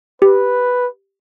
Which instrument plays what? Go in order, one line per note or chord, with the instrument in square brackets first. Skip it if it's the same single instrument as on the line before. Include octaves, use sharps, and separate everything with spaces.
[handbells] G4 [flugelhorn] B4